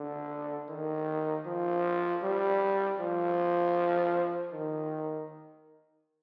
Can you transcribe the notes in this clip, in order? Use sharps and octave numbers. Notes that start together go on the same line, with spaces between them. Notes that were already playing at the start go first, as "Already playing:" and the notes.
Already playing: D3
D#3
F3
G3
F3
D#3